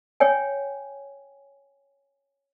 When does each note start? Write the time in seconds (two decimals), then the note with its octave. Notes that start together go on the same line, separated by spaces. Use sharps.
0.20 C#5 G5 G#5